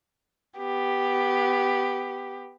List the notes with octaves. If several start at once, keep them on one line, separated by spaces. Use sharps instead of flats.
B3 G4